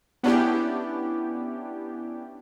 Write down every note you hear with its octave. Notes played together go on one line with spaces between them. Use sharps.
B3 C#4 D4 E4 G4